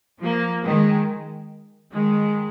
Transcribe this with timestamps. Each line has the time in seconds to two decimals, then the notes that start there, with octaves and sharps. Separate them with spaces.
0.21 F3 A#3
0.64 D#3 G#3
1.92 D#3 G#3